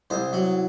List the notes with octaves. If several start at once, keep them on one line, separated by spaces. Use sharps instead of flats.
C2 C5
F#3